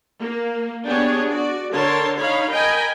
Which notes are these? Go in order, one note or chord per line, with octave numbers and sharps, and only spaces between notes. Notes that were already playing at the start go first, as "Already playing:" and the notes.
A#3
B3 D4 G4 G#4 C#5
F#4 D5
D3 A#4 C#5 A5 C6
D#4 C#5 F5 B5
A#4 D#5 G5 G#5 B5